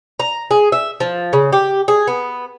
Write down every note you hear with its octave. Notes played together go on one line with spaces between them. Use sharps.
A#5
G#4
E5
F3
C#3
G4
G#4
B3